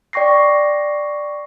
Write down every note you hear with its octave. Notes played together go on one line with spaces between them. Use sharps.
D5 G5 C#6 A#6 C7